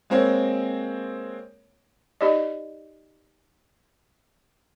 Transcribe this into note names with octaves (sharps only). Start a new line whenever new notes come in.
G#3 A#3 C4 A#4 C#5
D#4 G4 D5 D#5